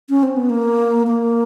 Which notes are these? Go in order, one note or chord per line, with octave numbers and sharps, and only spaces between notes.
C#4
C4
B3
A#3
A#3